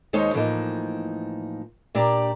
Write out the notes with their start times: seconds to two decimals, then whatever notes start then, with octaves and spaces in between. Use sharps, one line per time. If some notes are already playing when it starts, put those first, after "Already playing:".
0.13 D#2 G#3 D#4 C5 C#5
0.34 A2 E3 F3 A#3 B3 D#4
1.95 A#2 D4 G4 D5 A#5